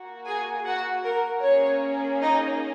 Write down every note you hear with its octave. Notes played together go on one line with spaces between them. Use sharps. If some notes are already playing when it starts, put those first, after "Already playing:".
Already playing: A#3 F#4
G#4 G#5
F#4 F#5
A#4
A#3 C#4 G#4 C#5
D#4 D#5